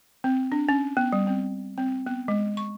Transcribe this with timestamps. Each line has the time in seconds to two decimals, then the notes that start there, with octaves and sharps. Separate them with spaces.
0.24 C4
0.52 D4
0.69 C#4
0.97 B3
1.13 G3
1.27 C4
1.78 C4
2.06 B3
2.28 G#3
2.57 C#6